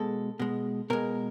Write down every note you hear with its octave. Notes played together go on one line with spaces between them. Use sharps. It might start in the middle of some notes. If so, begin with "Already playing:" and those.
Already playing: B2 G#3 A4
B2 G#3
B2 G#3 A#4